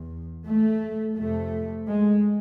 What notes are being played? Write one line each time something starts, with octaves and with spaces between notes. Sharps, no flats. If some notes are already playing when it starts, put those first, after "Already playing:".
Already playing: E2
A3
F2 C3 A3
G#3